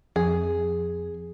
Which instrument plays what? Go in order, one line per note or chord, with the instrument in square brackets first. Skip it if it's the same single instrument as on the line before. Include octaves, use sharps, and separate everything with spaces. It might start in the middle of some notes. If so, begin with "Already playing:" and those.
[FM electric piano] F2 [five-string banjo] G#4